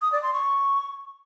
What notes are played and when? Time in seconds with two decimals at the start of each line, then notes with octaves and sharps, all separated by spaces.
0.02 D#6
0.12 D5
0.23 C6
0.33 C#6